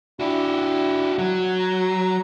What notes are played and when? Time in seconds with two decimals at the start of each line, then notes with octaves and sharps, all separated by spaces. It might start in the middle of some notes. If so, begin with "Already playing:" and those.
0.20 D4 E4 F#4 G4
1.19 F#3 F#5
1.59 A#5